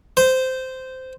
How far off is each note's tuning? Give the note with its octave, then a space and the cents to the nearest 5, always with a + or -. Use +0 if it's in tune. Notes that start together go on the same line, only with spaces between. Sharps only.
C5 -15